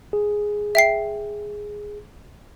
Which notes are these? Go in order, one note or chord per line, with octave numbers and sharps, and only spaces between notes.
G#4
E5 G5 C7